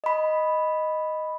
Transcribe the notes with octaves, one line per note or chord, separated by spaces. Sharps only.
D#5 B5